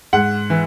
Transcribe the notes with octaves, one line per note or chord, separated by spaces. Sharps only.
G#2 F#5
E3